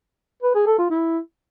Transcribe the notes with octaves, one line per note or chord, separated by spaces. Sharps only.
B4
G#4
A4
F4
E4